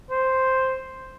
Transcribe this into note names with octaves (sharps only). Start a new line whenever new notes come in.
C5